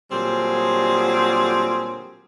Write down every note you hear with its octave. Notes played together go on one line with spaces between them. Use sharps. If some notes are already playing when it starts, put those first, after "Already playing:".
A#2 D3 F#3 G3 C4 G#4